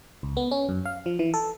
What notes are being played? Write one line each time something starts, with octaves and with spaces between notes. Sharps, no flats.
C#2
B3
C#4
F#2
F5
F3
E3
A4